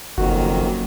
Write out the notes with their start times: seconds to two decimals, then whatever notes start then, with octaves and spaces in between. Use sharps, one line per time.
0.18 F#1 F2 D#3 F#3 A#3 C#4 F#4